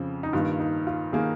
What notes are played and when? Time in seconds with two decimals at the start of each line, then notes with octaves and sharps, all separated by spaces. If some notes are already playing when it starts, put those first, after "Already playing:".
Already playing: F2 C#3 F3
0.23 D#4
0.33 G2 D#3 A#3 F4
0.59 D#4
0.87 F4
1.13 D#3 A#3 G#4